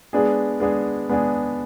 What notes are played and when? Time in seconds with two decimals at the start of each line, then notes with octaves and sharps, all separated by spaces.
0.13 G#3 B3 D4 G#4
0.60 G#3 B3 D4 G#4
1.09 G#3 B3 D4 G#4